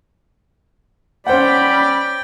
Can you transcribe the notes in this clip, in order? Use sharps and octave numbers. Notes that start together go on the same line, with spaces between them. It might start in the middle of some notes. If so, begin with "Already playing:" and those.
C#4 C5 D5 F#5 G5 B5